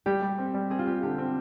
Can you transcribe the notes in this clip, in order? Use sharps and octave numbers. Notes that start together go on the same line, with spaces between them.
G3 G4
G3
C4
G3
C4 G#4
F4
C4 G4
D3 G4
C4